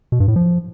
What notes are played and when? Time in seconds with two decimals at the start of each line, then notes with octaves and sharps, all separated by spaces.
0.12 B2
0.20 G2
0.28 A2
0.36 F3